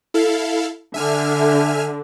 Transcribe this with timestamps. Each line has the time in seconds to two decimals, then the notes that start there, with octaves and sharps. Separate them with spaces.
0.14 E4 A4 F5
0.94 D3 E5 G#5 F6